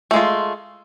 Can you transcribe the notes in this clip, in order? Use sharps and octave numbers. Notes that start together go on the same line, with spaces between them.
G#3 A3 F4